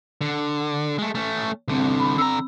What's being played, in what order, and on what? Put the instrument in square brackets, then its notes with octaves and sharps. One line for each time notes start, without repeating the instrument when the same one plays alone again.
[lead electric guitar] D3
G#3 A3
A3 C#4
[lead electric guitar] C2 D3 [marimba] C4
[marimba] B5
[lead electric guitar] D3 A#5 [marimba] E6